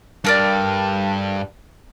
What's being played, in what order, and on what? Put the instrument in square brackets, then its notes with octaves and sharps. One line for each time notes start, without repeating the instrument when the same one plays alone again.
[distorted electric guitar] G2 [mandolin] A4 A#4 D5